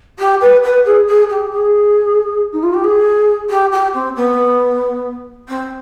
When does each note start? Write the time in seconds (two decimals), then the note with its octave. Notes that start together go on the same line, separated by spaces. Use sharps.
0.19 G4
0.41 B4
0.63 B4
0.85 G#4
1.07 G#4
1.29 G4
1.52 G#4
2.52 D#4
2.63 F4
2.73 G4
2.83 G#4
3.49 G4
3.72 G4
3.93 C4
4.16 B3
5.48 C4